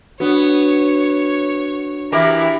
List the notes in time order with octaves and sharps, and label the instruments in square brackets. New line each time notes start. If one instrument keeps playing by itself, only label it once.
[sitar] B3 [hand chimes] D4 F#4 [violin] C#5
[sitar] E3 G4 A#4 [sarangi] E4